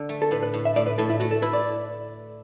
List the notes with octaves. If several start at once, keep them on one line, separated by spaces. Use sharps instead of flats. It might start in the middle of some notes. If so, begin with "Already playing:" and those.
Already playing: D3 D4
A3
A4
A2 B4
B4
A2
E5
A2 D5
B4
A2 A4
E4
A3 F#4
A4
E4 B4
D5